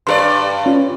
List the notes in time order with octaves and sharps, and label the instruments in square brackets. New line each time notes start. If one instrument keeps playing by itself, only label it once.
[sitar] G2 A4 D5 [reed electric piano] C6
[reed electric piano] C#4 F4